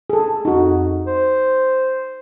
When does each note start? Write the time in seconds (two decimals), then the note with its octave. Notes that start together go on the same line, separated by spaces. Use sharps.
0.10 G#4 A4
0.45 F2 D#4 F#4
1.07 C5